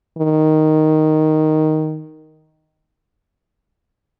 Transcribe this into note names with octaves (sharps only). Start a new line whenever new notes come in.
D#3